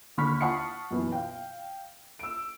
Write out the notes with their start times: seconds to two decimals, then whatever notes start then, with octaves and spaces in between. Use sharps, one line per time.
0.17 D#2 D3 B5 C#6 F6 B6
0.41 F#5 A5 C#6 D#6 C7 C#7
0.91 F#2 B2 E3
1.12 F5 G5
2.19 E6 D7